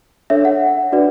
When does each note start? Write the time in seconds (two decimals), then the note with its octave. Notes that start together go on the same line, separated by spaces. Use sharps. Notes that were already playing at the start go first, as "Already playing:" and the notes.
0.30 D4 A4 C#5 E5
0.45 F#5
0.92 D4 F#4 B4 D5